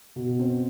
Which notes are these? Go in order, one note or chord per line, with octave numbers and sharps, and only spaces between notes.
B2
C4